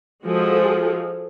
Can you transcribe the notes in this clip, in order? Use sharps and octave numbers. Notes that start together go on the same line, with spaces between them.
F3 G#3 F#4 G#4 A4